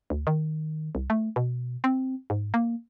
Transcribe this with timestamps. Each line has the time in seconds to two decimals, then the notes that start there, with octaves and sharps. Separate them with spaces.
0.10 D2
0.27 D#3
0.95 C2
1.10 A3
1.36 B2
1.84 C4
2.30 G#2
2.54 A#3